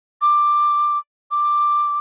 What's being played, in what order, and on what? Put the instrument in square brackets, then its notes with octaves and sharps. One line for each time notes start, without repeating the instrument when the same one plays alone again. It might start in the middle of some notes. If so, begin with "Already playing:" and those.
[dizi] D6
D6